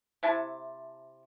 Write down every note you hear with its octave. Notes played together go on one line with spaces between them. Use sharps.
C3 E4 A5